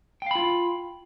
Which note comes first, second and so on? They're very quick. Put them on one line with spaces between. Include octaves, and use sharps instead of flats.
G5 F5 B5 F4